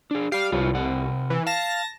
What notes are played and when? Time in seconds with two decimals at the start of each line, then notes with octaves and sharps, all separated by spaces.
0.11 D4 G#4
0.32 G4 D5 F5
0.52 C2 F4 B4 C#5
0.74 C3 F#5
1.30 E3
1.47 F5 A5 A#6